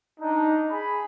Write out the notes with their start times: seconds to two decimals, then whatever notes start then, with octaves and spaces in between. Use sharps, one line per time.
0.20 D4 D#4
0.70 G#4 B5